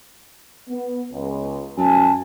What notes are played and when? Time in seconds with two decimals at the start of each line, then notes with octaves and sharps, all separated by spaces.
0.69 B3
1.12 C#2
1.78 F#2 G#5 A5